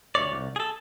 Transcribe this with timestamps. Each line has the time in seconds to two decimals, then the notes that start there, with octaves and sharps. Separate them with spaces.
0.15 D2 B2 C#5 D5
0.32 C2
0.56 G#4 A4